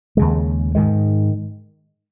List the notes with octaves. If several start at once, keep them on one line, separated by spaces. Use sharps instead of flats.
D#2 C#3 G#3
G#2 D#3 G#3